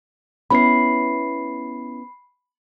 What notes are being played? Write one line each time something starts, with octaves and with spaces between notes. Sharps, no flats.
B3 C#4 E4 B5 C7